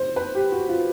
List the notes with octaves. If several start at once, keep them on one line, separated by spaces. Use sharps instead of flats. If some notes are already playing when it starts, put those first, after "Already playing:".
Already playing: C5
B4
G4
F#4
F4